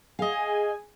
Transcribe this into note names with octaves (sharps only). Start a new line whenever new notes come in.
G#4 D#5 F5 G#5